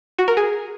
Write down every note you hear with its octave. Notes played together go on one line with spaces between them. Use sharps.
F#4
A#4
G#4